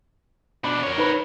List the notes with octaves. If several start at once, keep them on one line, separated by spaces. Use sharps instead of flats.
B2 D4 B5
A#4 C#5
D#4 B4 B5